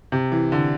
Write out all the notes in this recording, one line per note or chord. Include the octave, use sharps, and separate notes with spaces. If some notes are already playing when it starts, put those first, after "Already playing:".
C3
E3
D3